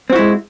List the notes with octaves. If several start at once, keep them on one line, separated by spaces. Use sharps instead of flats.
G#3 C4 E4 F#4